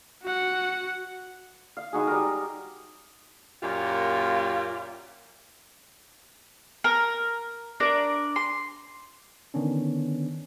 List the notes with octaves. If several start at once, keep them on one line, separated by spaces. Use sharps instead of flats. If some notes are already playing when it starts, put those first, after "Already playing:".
F#4 F#5
F5
G#3 D#4 F#4 G#4
G3 D#4 A#4
F#2 A#2 A#3 F4 G4
A#4
D4 A#4 D5
C6
D3 D#3 B3 C#4 D4